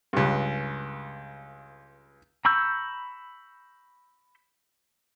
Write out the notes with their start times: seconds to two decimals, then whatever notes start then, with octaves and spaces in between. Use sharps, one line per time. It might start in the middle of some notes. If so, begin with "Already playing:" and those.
0.13 C#2 G2
2.45 A#5 B5 C#6 E6 G6